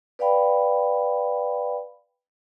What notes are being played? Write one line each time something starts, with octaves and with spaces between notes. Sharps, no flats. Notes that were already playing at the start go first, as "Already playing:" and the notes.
B4 D5 F5 G5 B5